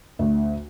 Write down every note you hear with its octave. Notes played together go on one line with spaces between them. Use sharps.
D2